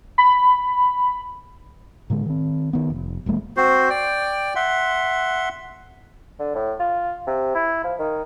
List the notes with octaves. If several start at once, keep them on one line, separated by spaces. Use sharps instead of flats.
B5
A2 D3 G#3
D#3 C4
D#3 B3
F1
D#1 E2 G#3 A#3
C4 F#4 C5
D5 G5
E5 F#5 C6
D3
A2
F4
C3
E4
F3
D#3